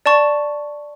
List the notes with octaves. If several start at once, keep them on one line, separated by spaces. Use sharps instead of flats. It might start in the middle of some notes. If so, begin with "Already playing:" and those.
D5 A5 C#6